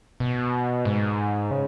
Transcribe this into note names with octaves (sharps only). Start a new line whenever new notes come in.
B2
G#2
C#3